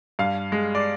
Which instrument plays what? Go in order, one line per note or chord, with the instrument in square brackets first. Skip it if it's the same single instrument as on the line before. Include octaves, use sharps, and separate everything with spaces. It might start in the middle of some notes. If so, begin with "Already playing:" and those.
[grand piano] G2 F5
G#3
D5